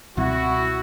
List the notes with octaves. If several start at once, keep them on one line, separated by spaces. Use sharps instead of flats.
C#2 B2 G3 C4 E4 F#4